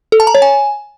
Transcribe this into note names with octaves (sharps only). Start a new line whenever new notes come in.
A4
A5
A#5
C#5
G#5